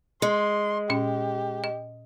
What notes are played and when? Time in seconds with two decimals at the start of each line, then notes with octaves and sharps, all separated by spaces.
0.22 G#3 C6
0.90 A#2 C#4 G4 D#5
1.64 D#5